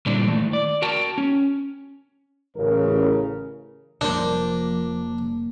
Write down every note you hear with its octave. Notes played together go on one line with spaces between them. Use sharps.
A#2 D3 G3 C4 D4 E4
D#3 E3 A3
D5
F#4 A#4 G5 A5
C#4
A1 C#3 A#4
F1 F3 F#3 A#3 D4 C5